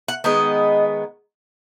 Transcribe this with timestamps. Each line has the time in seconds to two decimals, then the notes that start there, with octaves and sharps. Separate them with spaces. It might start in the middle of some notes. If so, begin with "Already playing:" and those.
0.08 F#5
0.24 D#3 G#3 B3 D#5